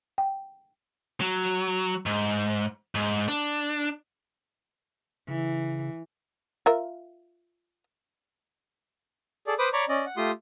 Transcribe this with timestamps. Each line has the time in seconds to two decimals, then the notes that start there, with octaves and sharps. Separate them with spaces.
0.18 G5
1.21 F#3
2.06 G#2
2.95 G#2
3.28 D4
5.28 C#3 E3
6.66 F4 A#4 E5
9.47 G#4 A4 D5
9.59 B4 C5 B5 D6 D#6
9.73 C#5 D5 A#5 B5 C#6 D6
9.89 C#4 D5 D#5
10.06 F#5
10.17 A3 F4 G4 C6 D#6